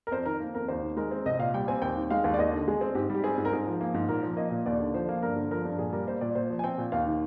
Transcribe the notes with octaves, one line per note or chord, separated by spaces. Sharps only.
A#4
F2 C5
D#3 A#4
A#3
F2 A#4
D#2 C5
D#3
G#3 A#4
C4
C2 D#5
A#2 F5
G3 G5
C4 G#5
D#2 G5
D#3
G#3 F5
D#2
D5
D#2 D#5
D3
G#3 G#4
C4
G#2 G4
G3 G4
C4 G#4
G#2
A#4
G#2 G#4
F3
A#3
G#2
A#2 A#4
F3
A#3 D#5
A#2
D#2 D5
D3
F3 C5
A#3
G2 A#4
D3
F3 A#4
G2
A#2 G#4
G3 A#4
A#3 C5
A#2 D5
A#2 C5
F3
G#5
C4 G5
A#2
D#2 F5
D#3